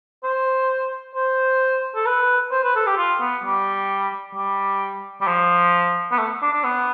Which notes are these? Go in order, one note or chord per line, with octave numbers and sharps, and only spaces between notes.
C5
C5
A4
B4
C5
B4
A4
G4
F4
B3
G3
G3
G3
F3
B3
A3
D4
D4
B3